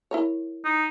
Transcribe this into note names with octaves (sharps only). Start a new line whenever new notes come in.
E4 A#4 C#5
D#4